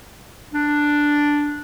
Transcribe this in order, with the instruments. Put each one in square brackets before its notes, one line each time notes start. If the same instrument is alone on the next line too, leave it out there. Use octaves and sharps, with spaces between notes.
[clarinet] D4